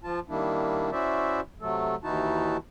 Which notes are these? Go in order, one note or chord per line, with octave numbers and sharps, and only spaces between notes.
F3 F4 A5
D#3 G3 A#3 D4 E4
C#4 E4 F#4 C5 D5 E5
C3 F#3 A3 A4
D#2 E3 D#4 E4 F#4 A5